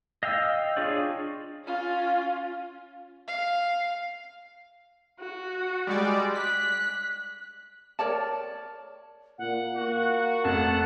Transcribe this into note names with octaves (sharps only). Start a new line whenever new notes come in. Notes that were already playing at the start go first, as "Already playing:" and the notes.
D#5 F5 G5 E6
D4 F4 G#4 C#5 D5
C#4 F4
F5
F#4
G3 G#3 D5
F#6 B6
A#4 C#5 D5 A5
A#2 F#5
A#3 F#4
F1 F#5 A5